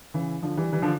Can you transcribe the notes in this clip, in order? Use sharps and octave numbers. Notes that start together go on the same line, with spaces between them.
C#3 E3
D3 F3
E3 G3
E3 G3
D3 F3